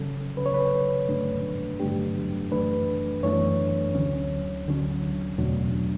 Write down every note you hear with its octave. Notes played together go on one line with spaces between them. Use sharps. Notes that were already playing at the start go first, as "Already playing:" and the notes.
Already playing: C#3 F#3 C#4 A4
C#3 F#3 C#4 B4
C#5
B4
G2 D3 F#3 A3 D4
G2 D3 F#3 A3 D4 G4
F#2 E3 A3 D4 B4
F#2 E3 A3 D4 C#5
D2 D3 F#3 C#4
D2 D3 F#3 C#4
E2 B2 F#3 A3 D4